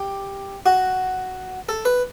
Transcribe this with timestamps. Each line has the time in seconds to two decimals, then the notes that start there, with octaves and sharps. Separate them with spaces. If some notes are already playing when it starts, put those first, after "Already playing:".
Already playing: G4
0.66 F#4
1.69 A4
1.85 B4